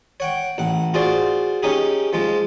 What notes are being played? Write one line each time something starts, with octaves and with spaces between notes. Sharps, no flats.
C#5 F#5 G5
A1 F#5
F4 F#4 G#4 C5 D5
C#4 D#4 G4 G#4
F3 G#3 F4